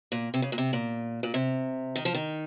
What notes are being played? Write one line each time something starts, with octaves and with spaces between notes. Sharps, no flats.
A#2
C3
C#3
A#2
C3
A#2
A#2
C3
D#3
F3
D#3